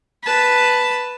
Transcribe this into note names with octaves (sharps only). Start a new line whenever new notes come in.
B4 A5